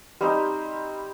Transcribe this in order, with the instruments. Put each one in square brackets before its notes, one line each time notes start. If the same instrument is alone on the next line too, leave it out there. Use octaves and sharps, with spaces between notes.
[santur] G3 C4 D#4 C5